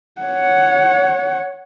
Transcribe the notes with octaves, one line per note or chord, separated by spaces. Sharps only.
C#5 F#5